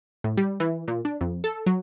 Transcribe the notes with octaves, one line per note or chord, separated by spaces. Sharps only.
A2
G3
E3
A#2
D4
F2
A4
F#3